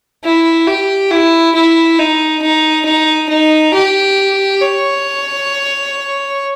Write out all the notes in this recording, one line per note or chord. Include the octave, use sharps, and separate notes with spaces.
E4
G4
E4
E4
D#4
D#4
D#4
D#4
G4
C#5